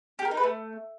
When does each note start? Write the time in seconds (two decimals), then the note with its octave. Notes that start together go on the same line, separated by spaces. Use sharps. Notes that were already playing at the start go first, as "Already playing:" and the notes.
0.19 G4
0.25 A#4
0.31 D#4
0.37 B4
0.43 A3